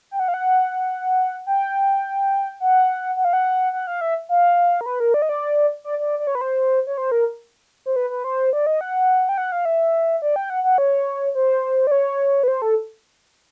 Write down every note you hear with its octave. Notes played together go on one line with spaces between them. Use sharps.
G5
F#5
F5
F#5
G5
F#5
F#5
F5
F#5
F#5
F5
E5
F5
A#4
B4
A#4
D5
D#5
D5
D5
D5
D5
C#5
B4
C5
C#5
C5
A#4
C5
B4
B4
C5
D5
D#5
F#5
G5
F#5
F5
E5
D5
G5
F#5
F#5
C#5
C5
D5
C#5
B4
C5
A4